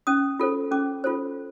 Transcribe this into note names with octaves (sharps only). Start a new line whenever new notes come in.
C#4 D#6
F4 A4 C5
C#4 D6
F4 A4 C5